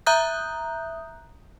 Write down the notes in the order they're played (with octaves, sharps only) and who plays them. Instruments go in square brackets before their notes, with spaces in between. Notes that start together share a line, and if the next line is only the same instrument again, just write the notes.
[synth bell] E5 A#5 D#6 F#6 G6